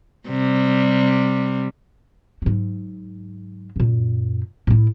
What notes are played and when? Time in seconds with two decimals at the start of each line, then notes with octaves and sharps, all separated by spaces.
0.28 C3 G3
2.42 G#2 F#3
3.76 F#2 A#2
4.67 A2 E4